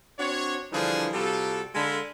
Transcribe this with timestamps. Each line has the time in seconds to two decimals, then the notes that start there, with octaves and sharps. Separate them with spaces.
0.19 C4 D4 F#4 C#5
0.72 D3 E3 F3 G3 D4 G#4
1.13 C3 G3 F4 F#4 A4
1.74 D3 G#3 A4 F5 B5